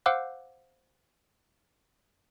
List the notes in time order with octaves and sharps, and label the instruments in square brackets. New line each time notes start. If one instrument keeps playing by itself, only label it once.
[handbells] C5 F5 F#5 D6 E6 F#6